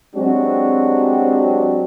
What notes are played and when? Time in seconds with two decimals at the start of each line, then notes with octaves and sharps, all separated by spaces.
0.15 F#3 G#3 C4 D4 F#4 G4